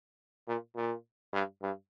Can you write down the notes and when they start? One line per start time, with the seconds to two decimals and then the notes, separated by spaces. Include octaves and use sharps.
0.47 A#2
0.76 A#2
1.33 G2
1.62 G2